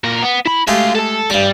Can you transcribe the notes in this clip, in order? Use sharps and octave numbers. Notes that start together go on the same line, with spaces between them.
A#2 A#4
B3
E4 B5
G#3 A3 F#4 G4 F5
A4 A5
G2 G3 D6